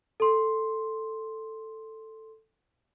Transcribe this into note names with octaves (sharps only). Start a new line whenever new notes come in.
A4 C6